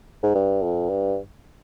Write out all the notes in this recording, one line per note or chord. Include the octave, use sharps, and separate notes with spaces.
G#2
G2
F2
G2